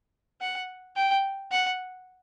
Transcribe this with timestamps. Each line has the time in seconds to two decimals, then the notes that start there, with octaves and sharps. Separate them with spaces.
0.41 F#5
0.96 G5
1.51 F#5